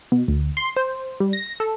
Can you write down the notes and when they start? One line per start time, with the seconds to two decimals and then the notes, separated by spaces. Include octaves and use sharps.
0.12 B2
0.28 D2
0.57 C6
0.76 C5
1.20 G3
1.33 A#6
1.60 A4